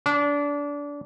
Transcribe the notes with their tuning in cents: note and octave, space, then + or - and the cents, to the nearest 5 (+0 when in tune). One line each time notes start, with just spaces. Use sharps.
D4 -25